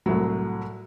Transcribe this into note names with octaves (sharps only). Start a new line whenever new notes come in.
C2 A2 F#3